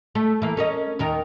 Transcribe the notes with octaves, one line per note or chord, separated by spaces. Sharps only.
A3
E3 A#3
C#4 A#4 D#5
D#2 D#3 A#4